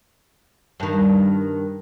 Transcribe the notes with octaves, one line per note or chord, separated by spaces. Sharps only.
G2 D#3